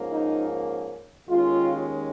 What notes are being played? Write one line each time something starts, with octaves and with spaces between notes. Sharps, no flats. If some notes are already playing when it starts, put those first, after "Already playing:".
Already playing: G#2 F3 A#3 C#4
D#4
D#2 D#3 G#3 C#4 F4